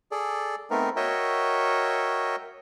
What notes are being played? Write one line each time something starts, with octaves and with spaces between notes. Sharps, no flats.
G#4 A4 D5
A3 B3 C4 D#4 A#4
F#4 A#4 C#5 D#5 E5 G5